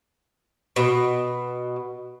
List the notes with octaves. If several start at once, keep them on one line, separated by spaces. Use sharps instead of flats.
B2